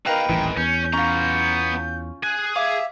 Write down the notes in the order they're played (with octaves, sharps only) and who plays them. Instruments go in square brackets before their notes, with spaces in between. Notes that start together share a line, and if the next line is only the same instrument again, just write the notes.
[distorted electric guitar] B2 F5 [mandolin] D#4 A#4 B4 [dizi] G5
[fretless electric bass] D#1 A1 E3 [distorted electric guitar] G#2
[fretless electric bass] E2 [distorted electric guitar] C#4 [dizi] G6
[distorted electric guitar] B3 A#5 [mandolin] C#4 F4
[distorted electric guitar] G#4 [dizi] F#6
[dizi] E5 [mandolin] F5 D6